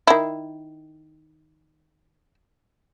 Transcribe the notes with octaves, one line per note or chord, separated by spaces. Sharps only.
D#3 E4